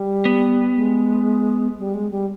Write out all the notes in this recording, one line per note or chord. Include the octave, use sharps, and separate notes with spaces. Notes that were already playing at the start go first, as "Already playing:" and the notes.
Already playing: G3
B3
G#3
G3
G#3
G3